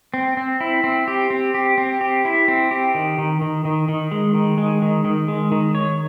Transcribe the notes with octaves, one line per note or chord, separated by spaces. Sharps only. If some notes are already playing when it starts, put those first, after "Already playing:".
C4
C4
E4
C4
G4
C4
G4
C4
G4
E4
C4
G4
D#3
D#3
D#3
D#3
D#3
G#3
D#3
G#3
D#3
D#3
G#3
D#3
C#5